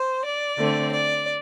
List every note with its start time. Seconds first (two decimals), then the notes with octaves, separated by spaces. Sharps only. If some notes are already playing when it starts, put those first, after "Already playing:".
Already playing: C5
0.25 D5
0.58 D3 A3 C4
0.93 D5